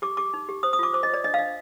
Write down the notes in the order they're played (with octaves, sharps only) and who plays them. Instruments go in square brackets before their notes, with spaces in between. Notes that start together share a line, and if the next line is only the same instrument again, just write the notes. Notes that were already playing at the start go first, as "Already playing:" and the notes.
[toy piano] G4 D6
G4 D6
D#4
G4
C5 D#6
D#6
F4 D6
C5 D6
D#5
C5 D5
D4 D#5
F5
D4 D#5